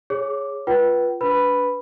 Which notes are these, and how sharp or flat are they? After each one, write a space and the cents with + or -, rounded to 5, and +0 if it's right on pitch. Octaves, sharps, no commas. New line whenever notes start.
G#4 +0 C#5 +0 D6 +0
F4 +0 B4 -20 G5 -35
D4 -25 B4 +5 B5 +0